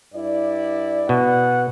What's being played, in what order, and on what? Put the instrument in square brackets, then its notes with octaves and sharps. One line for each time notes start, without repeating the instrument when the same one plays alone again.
[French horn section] G2 E4 D5
[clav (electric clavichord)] B2 [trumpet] F#5